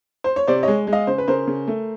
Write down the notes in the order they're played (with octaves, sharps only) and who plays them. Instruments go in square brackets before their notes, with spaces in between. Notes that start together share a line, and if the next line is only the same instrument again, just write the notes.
[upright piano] C5
C#5
C3 C5 D5
G#3 C#5 D#5
G#3
D#5 F5
C#3 C5
B4
C#3 A#4 C5
C#3
A3